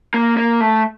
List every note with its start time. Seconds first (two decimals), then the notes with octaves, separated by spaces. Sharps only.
0.14 A#3
0.37 A#3
0.60 A3